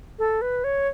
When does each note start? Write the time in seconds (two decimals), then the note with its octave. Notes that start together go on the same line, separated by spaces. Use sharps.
0.19 A4
0.42 B4
0.64 C#5